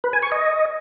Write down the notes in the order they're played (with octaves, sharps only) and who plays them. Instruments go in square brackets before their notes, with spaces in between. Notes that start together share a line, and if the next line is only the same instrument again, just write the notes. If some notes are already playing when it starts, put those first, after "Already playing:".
[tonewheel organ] B4
G#5
C#6
D#5